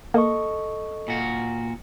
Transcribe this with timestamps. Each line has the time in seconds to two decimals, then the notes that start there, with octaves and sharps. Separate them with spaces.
0.14 A#3 A4 D#5 C#6
1.08 A#2 F#4